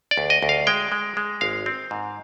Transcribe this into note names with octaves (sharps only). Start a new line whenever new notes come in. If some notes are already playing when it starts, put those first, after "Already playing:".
D5
D2
D#5
D2
F5
G#3 G5
G#3
G#3
G#1 F5
C4
G#2